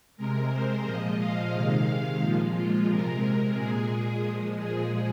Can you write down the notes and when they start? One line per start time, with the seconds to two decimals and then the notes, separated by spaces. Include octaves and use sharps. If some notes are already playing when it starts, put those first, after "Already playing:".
0.17 C3 G#3 A#4
0.51 C5
0.84 A#2 F3 G#3 D#5
1.19 F5
1.52 C3 D#3 G#3 F5
2.20 A#2 F3 G#3
2.55 F4
2.87 C3 G#3 A#4
3.55 A#2 G#3 G#4
4.23 A#2 F3 G#3
4.58 G#4